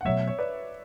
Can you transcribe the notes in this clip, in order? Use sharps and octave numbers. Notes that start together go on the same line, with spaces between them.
F#5
B2 F#3 A3 C#5 E5
C#5
B4 D5